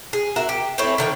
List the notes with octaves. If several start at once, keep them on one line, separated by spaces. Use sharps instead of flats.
G#4
F#4 A#4 E5
G4
A3 C4 E4 C#5
D3 D#3 C#5